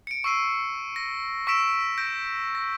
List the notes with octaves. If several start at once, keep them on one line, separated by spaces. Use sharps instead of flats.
C#7 D7
C#6 E6 C7 D#7
A#6
C#6 E6 B6 D7 E7
G6 A#6 D7
A#6